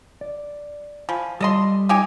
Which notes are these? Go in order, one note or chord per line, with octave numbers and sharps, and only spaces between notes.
D5
F3 G#5 B5
G3 A4 D#5 C6
D#4 G4 G#5